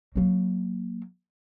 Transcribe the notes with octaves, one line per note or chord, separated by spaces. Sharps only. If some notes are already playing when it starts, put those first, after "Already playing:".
F#3 A#3